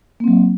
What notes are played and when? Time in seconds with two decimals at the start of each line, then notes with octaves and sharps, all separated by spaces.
0.20 A#3
0.24 C4
0.28 F#3